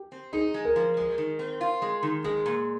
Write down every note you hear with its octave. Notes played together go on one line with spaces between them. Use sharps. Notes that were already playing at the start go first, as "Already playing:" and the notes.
Already playing: G4
C4
D#4 G#4
G#3
A#4
F3
G#3
D#3
C4
F4
G#3
D#3
G#3 G#4
A#2